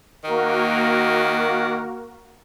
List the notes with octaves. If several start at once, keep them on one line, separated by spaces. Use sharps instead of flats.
D#3 A#3 F#4 A#4